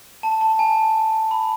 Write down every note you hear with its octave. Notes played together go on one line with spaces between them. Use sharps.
A5
A5
G#5
B5